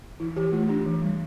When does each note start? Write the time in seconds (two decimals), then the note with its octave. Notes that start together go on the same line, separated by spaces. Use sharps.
0.20 E3 E4
0.36 E3 G4
0.52 A3 F4
0.69 D4 G4
0.86 E3
1.02 G3